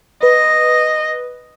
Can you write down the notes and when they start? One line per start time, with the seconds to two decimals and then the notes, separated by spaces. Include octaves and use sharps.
0.23 B4 D#5